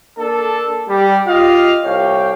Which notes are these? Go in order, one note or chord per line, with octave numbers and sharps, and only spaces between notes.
A#3 D4 A4
G3
F4 G4 D#5 F5
C2 C#5 F5 G5